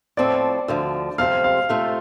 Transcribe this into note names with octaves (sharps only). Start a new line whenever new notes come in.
A2 F3 C4 A4 D5
D2 D3 F3
F2 C3 G3 C4 F5
F5
C3 A3 F4 A4 C5